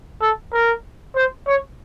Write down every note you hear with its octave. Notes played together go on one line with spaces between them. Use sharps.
A4
A#4
C5
C#5